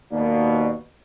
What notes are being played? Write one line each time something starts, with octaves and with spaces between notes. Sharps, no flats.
D#2 B2 A#3 D5